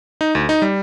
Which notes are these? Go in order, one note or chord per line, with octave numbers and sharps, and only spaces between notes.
D#4
D2
D#4
G3